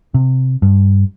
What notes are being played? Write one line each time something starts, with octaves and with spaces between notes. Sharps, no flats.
C3
G2